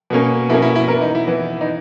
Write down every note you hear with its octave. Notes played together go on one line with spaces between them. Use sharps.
B2 A#3 C#4
B2 A#3 C#4 E4
E4
E4
E3 B3 A#4
D#4
E4
E3 B3
D#4